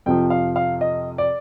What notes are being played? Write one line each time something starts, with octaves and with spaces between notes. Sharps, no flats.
F2 C3 F3 G5
F5
F5
D#5
D5